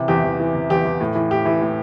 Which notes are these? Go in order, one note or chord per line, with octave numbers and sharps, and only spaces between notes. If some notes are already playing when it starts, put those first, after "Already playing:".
Already playing: C3 E3
E2 G4
E2
E3
C3
E2 G4
E2
A2
E3
A2 G4
E3
A2